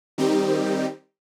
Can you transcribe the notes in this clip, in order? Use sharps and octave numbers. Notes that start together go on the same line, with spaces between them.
D#3 G3 C4 D#4 G4